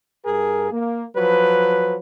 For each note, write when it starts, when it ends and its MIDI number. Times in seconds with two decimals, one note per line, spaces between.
0.25 0.71 43
0.25 0.71 68
0.25 0.71 70
0.71 1.03 58
1.16 1.97 53
1.16 1.97 54
1.16 1.97 71